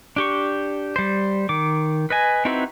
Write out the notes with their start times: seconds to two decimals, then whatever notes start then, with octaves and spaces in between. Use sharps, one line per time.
0.16 D4 G4 C#6
0.96 G3 C5
1.49 D#3 D6
2.10 B4 D#5 G#5
2.45 C4 D#4 E4 F#4 B4